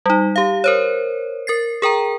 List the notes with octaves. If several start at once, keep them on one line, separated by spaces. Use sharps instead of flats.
G3 D#4
G4 F5
A#4 C5 C#5
A#4 A6 C7
G#4 A#4 G5 A#5